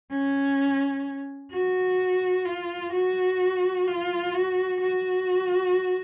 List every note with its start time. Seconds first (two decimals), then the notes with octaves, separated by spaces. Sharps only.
0.11 C#4
1.52 F#4
2.45 F4
2.92 F#4
3.87 F4
4.34 F#4
4.80 F#4